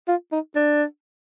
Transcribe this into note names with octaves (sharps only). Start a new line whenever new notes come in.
F4
D#4
D4